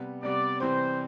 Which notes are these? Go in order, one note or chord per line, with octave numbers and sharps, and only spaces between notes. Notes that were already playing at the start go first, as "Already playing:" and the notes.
Already playing: C3 G3 B3
C3 G3 B3 D5
C3 E3 G3 C4 C5